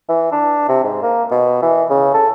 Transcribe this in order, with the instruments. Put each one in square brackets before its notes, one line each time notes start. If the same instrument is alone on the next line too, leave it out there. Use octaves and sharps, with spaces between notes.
[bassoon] E3
D4
C3
G#2
A#3
B2
E3
C#3
A4